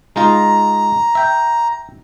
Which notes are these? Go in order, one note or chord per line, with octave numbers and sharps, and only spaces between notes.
G#3 D#4 F4 A#5
E5 G5